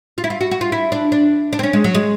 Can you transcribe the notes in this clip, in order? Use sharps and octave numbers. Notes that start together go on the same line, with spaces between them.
F4
E4
F4
F#4
F#4
F4
E4
D4
D4
D4
C4
C#4
G#3
F#3
G#3